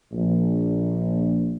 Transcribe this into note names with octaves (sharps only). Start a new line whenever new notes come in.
A#1